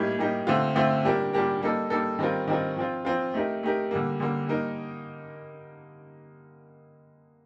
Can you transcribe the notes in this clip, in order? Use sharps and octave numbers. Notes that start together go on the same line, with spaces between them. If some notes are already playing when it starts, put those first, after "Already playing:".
Already playing: A2 G3 A#3 D#4 G4
A2 G3 A#3 D#4 G4
D3 A3 C4 F4
D3 A3 C4 F4
A#2 G3 D4 G4 A#4
A#2 G3 D4 G4 A#4
G3 A#3 D#4 A4
G3 A#3 D#4 A4
D#3 G3 C4 F4 A#4
D#3 G3 C4 F4 A#4
F3 C4 F4
F3 C4 F4
A3 D#4 G4 A#4
A3 D#4 G4 A#4
D3 G3 A#3
D3 G3 A#3
G3 A#3 D#4 A#4